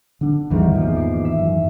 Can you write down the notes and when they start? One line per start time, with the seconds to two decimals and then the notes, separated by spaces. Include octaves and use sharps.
0.21 D3 D4
0.50 G#1 E2 G#2 D#3 E3 G3
0.75 E2 A#2 F3
0.96 D6 C7
1.25 E5
1.39 F#2